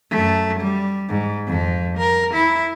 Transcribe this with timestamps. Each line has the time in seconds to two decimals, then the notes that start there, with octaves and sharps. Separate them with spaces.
0.10 F#2 A3
0.60 G3
1.09 G#2
1.47 F2 F3
1.97 A#4
2.34 E4